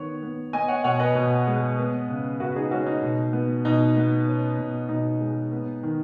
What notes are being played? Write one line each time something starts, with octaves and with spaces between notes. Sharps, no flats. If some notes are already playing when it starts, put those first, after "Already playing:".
Already playing: D#3 B3 C#5
B3
B3 D#5 G#5
C#5 F#5
B2 C#5 F#5
B4 D#5
B2
G#3
B3
C#3
C#3 F#4 B4
D#4 G#4
G#3 C#4 F#4
D#4
B2
B3
B2 D#4
B3
C#4
B2
B2 D#4
G#3
B3
D#3